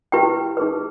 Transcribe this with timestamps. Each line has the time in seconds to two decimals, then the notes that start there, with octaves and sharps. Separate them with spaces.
0.12 E4 G4 B4 G5
0.57 D#4 G#4 B4